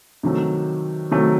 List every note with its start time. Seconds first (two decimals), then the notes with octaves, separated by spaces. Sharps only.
0.23 C3 D#3 F#3 A3
1.11 C3 D#3 F#3 A3